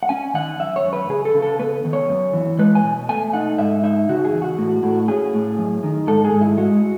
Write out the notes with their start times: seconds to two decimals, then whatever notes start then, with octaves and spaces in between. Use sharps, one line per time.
0.03 F#5
0.09 C#4 G#5
0.34 D#3 F#5
0.59 F#2 E5
0.76 C#5
0.84 F#2
0.93 B4
1.09 C#3 G#4
1.25 A4
1.34 C#3
1.42 A4
1.60 B3 B4
1.85 D#3
1.93 C#5
2.09 F#2
2.33 E3
2.59 G#3 B4
2.75 G#5
2.84 B2
3.09 A3 G#5
3.33 D#4 F#5
3.58 G#2 E5
3.83 D#4 E5
4.09 C#3 F#4
4.25 G#4
4.33 E2
4.42 F#4
4.58 A2
4.83 A2
5.08 C#4 G#4
5.33 A2
5.58 F#2
5.83 D#3
6.07 G#2 A4
6.25 G#4
6.32 G#2
6.41 E4
6.57 G#3 F#4